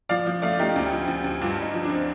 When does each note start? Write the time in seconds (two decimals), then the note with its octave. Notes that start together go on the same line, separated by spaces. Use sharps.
0.09 F3 D5 F5
0.26 F3
0.42 A3 D5 F5
0.59 A3 D#4 G4
0.76 D2
0.92 F3
1.08 D2
1.24 D2
1.41 G2 D4 F4
1.57 G2 D#4
1.74 F3
1.84 D4
1.90 C4